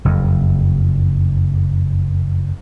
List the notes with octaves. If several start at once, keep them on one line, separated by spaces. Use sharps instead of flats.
F#1 F2